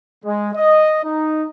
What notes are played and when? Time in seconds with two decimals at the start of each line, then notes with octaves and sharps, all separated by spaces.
0.25 G#3
0.55 D#5
1.04 D#4